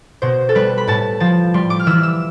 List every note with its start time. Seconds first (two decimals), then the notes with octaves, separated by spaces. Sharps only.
0.22 B2 C5
0.49 A4
0.55 G3 B4
0.78 B5
0.87 A2 A5
1.20 F3 A5
1.54 G3 C6
1.70 D6
1.80 F6
1.87 E3 E6
2.03 E6